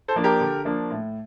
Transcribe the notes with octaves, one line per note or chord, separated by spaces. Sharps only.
A4 C5
F3 A#3 D4
G4 A#4
D3
F3 A#3 D4
A2